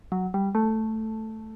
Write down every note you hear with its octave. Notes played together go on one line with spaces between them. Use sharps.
F#3
G3
A3